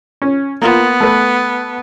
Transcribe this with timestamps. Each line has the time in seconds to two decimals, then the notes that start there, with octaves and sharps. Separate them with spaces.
0.22 C#4
0.62 A#3 B3 F4
1.00 A3 B4